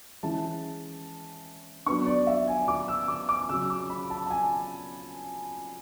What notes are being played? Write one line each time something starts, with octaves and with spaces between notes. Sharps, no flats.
E3 G#3 C#4 E4 A5
F#3 B3 D4 C#6
D5
E5
G#5
D6
E6
D6
D6
C#3 F#3 C#4 E6
D6
B5
A5
A5
G#5